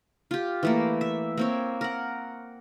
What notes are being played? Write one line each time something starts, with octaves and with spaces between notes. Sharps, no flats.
F4 G4
E3 A3 A#3
E5
A#3 C4 C#5
A#4 F#5